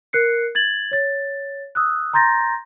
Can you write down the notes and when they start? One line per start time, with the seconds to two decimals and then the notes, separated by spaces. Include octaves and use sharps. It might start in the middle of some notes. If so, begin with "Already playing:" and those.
0.13 A#4 F#6 C7 C#7
0.55 G#6 A6 F#7
0.91 C#5 A6
1.75 D#6 E6 F#6
2.13 A#5 C6 G6 A6 A#6